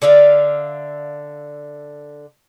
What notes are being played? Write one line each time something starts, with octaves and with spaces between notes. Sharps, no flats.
D3 D5 E5 F5